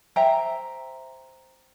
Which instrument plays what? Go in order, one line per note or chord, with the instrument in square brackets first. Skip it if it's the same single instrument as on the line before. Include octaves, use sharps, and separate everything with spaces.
[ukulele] C5 E5 G5 A#5